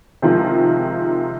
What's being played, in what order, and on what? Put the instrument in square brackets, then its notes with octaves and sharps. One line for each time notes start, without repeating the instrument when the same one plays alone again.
[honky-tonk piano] C3 D#3 F3 G#3